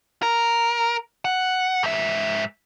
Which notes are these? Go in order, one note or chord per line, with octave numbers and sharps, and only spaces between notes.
A#4
F#5
G#2 E5